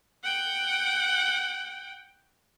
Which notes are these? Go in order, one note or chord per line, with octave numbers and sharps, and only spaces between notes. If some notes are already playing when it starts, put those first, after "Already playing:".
F#5 G5